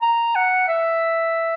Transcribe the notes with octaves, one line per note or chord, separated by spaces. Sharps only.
A#5
F#5
E5